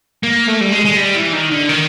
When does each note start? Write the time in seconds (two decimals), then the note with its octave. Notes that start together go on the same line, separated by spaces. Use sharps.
0.23 A#3
0.48 A3
0.60 G3
0.72 G#3
0.85 G#3
0.96 G3
1.15 E3
1.33 D#3
1.51 D3
1.69 D#3